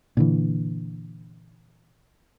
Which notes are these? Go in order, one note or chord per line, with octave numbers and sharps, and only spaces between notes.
A#2 D3 E3